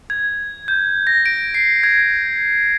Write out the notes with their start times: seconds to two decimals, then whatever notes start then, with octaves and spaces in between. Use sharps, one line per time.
0.10 G#6
0.68 G6
1.07 A#6
1.26 D7
1.54 C7
1.83 G#6